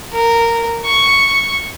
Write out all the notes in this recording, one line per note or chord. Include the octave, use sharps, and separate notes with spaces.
A#4
C#6